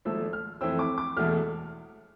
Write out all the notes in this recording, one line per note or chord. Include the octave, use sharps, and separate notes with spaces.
G#1 G#2 F3 A3 E6
F6
F2 E3 A3 C4 E6
D6
D6
E1 E2 B2 A3 F6